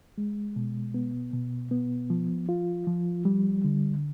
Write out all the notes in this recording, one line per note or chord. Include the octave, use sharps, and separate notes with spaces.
G#3
B2
B3
B2
B3
F3
F4
F3
G3
D3